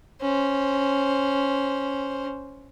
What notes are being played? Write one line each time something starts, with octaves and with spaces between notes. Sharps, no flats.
C#4 C5